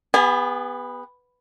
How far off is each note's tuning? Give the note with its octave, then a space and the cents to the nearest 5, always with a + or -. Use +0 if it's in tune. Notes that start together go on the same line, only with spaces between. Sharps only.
B3 +0 G#4 -45 G#5 +0